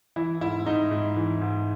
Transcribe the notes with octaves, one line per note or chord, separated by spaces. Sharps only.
E3 E4
G#2 E4
G#2 D#4
G#2
E3
G#2